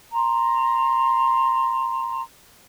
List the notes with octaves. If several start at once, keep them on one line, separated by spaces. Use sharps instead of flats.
A#5 C6